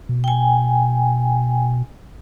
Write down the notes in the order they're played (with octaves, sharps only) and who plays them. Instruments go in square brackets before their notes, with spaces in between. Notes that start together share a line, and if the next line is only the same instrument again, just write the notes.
[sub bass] B2
[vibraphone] G5 G#5